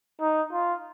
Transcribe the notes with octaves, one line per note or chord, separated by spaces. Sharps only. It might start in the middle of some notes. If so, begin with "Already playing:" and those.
D#4
F4